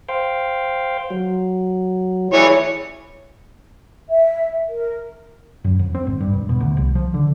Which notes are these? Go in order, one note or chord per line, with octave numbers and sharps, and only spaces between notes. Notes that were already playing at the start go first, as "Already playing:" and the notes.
C5 F5 G5
F#3
E3 G#4 C#5 D5
E5
A#4
F#2
F2
C4
G#1
G2
E1
B2
D2
C2
F3
D3